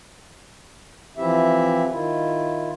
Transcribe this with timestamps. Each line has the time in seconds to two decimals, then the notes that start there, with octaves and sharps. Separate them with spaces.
1.17 E3 F3 C4 E4 G4 E5
1.90 D#3 E4 F4